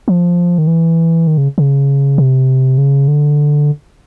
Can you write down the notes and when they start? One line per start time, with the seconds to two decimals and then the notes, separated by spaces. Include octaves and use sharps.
0.08 F3
0.58 D#3
0.67 E3
1.27 D#3
1.38 C#3
1.58 C#3
2.18 C3
2.78 C#3
3.08 D3